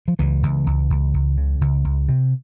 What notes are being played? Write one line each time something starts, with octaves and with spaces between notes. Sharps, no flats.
F3
C#2 E3
C#2
C#2
C#2
C#2
C#3
C#2
C#2
C3